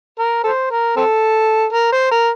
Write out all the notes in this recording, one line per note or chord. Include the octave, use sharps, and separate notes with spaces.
A#4
A4 C5
A#4
C4 A4
A#4
C5
A#4